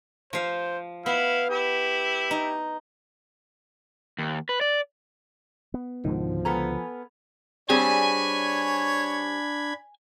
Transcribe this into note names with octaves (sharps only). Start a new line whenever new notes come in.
F3 C5 F5
B3 E4 F5
E4 G4
D#4
D#2
B4
D5
B3
C#2 G#2 B2 D3 D#3 F3
B3 A4 G#5 A#5 B5 F6
G3 C4 D4 G#4 C#5 G#5 B5 G#6